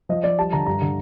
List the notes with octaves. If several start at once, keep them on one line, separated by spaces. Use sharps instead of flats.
F3 D#5
F3 D5
G3 A5
D3 A#5
G2 A#5
D3